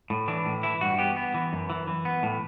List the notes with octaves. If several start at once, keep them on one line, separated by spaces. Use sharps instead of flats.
A2
E3 D4
A2
E3 E4
G2 F#4
B3 G4
B3
E3
F#2
E3
E3
B3
A2